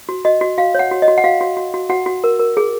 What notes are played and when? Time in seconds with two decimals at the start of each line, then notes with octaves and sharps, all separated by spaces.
0.09 F#4
0.25 F#4 D#5
0.41 F#4
0.58 F#4 F5
0.75 C#5 F#5
0.91 F#4
1.02 D#5
1.08 F#4
1.18 F#5
1.24 F#4 F5
1.41 F#4
1.57 F#4
1.74 F#4
1.90 F#4 F#5
2.06 F#4
2.24 A#4
2.39 A#4
2.57 G#4